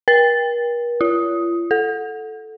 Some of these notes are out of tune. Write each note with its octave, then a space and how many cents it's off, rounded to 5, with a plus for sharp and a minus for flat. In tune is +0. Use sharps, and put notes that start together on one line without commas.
A#4 +45
F4 -40
A4 -5